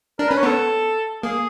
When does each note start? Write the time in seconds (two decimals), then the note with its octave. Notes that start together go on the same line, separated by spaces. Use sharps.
0.19 D4 A#4
0.28 C#4 B4
0.37 C#5
0.43 B3 A4
1.23 A#3 G#4